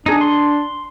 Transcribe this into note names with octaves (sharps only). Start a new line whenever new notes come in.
D4 D#4 G#4
C6